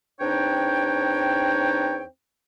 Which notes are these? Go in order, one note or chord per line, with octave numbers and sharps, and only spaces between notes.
E2 C4 D4 D#4 C#5 G5